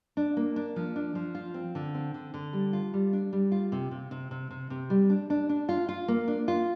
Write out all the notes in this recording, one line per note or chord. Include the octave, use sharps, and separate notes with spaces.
D4
A#3
D4
F3
D4
F3
F4
C4
D3
C4
D3
D3
G3
F4
G3
D4
G3
F4
C3
C3
C3
C3
C3
C3
G3
D4
D4
D4
F4
F4
A#3
D4
F4